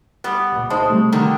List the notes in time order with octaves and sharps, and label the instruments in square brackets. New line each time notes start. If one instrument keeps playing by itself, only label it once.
[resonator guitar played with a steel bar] G3 B3
[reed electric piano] C#2 A#2
[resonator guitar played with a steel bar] G#3 [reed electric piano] D#4 C5 A5
[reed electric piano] C3 G3 A3
[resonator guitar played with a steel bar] D3 D#3